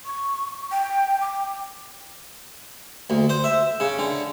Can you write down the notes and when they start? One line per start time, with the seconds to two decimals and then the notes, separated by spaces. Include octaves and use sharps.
0.05 C#6
0.72 G5
1.21 D6
3.10 D2
3.29 C5
3.44 E5
3.80 C#3
3.98 D3